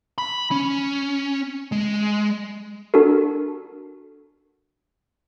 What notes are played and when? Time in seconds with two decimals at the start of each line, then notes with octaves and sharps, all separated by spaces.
0.18 B5
0.51 C#4
1.72 G#3
2.94 D4 F#4 A4 A#4